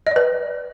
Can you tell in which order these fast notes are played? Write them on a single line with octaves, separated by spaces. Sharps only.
D#5 D5 B4